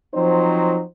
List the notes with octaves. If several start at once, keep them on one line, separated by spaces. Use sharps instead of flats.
F3 F#3 C4 D#4 C5